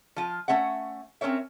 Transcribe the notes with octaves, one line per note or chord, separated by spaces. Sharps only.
F3 F4
A3 C#4 E5 F#5
C4 C#4 A#4 C#5 E5